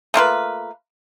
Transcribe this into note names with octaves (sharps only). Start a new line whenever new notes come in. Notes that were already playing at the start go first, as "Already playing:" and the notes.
A3 A#3 F4 B4